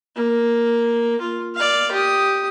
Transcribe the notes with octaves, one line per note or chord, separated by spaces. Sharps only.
A#3
F4
D5 F5
G4 D#6